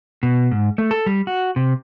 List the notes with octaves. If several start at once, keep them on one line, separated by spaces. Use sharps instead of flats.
B2
G#2
A3
A4
G3
F#4
C3